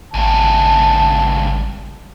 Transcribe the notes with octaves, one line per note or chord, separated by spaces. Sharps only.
G#1 C#2 G2 A5